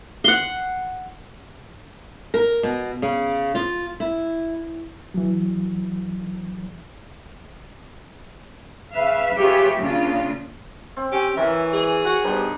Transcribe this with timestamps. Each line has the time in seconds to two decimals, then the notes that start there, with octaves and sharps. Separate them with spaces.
0.24 F#5 C6
2.34 A#4
2.63 B2
3.02 C#3
3.55 F4
4.00 E4
5.14 E3 F#3
8.92 C#3 B4 E5 F5
9.36 F4 G4 G#4 B4 C#5 E5
9.79 C#3 A#3 D4 F4
10.96 C4
11.12 C#4 G4
11.37 E3 A#4 C#5 E5 G#5
11.73 G#4
12.05 F#4 F#5
12.24 G3 B3 D4 D#4 C5